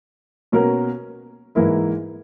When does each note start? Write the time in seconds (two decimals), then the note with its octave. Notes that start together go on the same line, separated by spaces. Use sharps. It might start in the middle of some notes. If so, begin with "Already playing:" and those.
0.52 B2 A#3 C#4 F#4 A#4
1.55 G#2 E3 A#3 E4 A#4